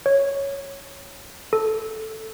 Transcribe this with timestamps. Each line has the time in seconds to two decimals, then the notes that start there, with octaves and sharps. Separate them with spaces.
0.06 C#5
1.53 A4